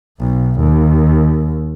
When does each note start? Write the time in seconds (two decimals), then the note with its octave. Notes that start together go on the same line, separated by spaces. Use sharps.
0.19 B1
0.60 D#2